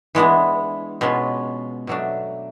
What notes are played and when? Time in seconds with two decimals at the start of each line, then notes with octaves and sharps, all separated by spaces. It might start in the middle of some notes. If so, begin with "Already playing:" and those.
0.15 E3 G#3 B3 D4
1.01 B2 G#3 C#4 F4
1.87 B2 F#3 A3 D4